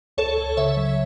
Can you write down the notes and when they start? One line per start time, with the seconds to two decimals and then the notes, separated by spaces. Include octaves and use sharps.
0.18 C#2 A4 C#5
0.38 C#2
0.57 C#3 C#5 E5
0.77 F#3